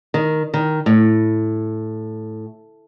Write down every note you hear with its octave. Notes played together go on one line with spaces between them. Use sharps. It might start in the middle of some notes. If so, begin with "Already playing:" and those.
D#3
D#3
A2